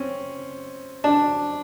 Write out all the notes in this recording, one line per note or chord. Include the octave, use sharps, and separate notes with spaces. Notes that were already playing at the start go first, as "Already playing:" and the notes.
Already playing: C4 C#4
D4